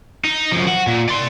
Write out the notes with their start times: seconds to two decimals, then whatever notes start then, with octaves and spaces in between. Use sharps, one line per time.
0.25 D#4
0.52 F#2 F3
0.68 F#4
0.87 A#2
1.09 D5 C6